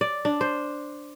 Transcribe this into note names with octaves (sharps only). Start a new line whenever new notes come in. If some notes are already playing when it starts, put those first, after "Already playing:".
D5
D4
C5